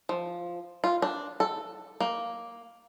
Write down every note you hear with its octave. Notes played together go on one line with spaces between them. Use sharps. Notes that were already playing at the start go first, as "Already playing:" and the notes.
F3
F4
D4
A4
A#3